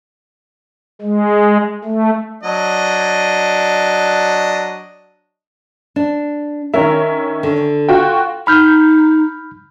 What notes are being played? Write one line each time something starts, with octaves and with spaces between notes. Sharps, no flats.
G#3
A3
F#3 D4 D#5
D4
D#3 C#4 A#4 E5
D3
F4 F#4 G5
D#4 B5 F6 G6